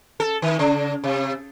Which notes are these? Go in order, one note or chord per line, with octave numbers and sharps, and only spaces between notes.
A4
D#3
C#3
C3